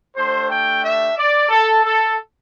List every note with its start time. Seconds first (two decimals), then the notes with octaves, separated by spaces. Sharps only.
0.15 A3 D4 G4 C5
0.48 G5
0.83 E5
1.16 D5
1.49 A4
1.83 A4